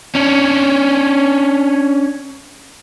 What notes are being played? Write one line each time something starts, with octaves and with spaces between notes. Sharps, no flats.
C#4 D4